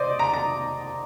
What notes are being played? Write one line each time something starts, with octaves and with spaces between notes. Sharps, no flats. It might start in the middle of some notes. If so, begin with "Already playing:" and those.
Already playing: C5 D5 D#5
A#5
A#5